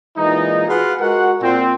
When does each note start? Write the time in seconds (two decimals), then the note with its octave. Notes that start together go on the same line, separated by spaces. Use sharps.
0.17 A#2 E3 G#3 D#4
0.68 F4 F#4 G#4 B4 F5 F#5
1.00 G#3 F#4 A#4 F#5
1.42 A#2 C4